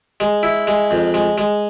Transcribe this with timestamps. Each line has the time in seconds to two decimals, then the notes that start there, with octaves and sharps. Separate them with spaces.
0.20 G#3
0.43 E4
0.67 G#3
0.91 F2
1.14 G#3
1.38 G#3